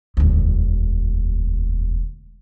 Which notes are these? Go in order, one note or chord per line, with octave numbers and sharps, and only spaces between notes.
E1 D2